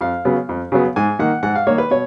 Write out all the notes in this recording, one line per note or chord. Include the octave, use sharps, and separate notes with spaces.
F2 F5
C#3 F#3 B3
F2
C#3 F#3 B3
G#2 G#5
D#3 A#3 F#5
G#2 F#5
F5
D#3 A#3 C#5
B4
B2 C#5